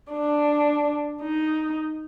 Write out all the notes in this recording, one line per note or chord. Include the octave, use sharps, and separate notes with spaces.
D4
D#4